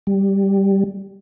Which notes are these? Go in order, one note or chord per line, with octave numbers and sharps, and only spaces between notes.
G3